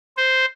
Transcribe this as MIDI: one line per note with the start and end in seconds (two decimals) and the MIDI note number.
0.17 0.45 72